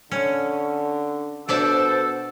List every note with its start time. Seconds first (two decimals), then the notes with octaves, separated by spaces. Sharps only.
0.12 D3 C#4
1.49 B2 D4 A4 C5 D5 E5